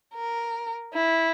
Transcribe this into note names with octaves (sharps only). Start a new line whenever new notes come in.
A#4
E4